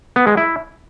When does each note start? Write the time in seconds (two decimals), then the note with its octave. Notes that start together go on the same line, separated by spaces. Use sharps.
0.16 B3
0.27 G#3
0.37 E4